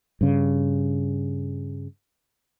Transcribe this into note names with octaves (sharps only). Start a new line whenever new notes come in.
G2 C#3